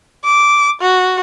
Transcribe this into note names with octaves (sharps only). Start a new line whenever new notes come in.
D6
F#4